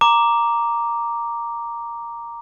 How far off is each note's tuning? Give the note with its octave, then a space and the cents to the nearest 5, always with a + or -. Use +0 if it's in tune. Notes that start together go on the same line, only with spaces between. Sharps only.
A#5 +0 D6 +0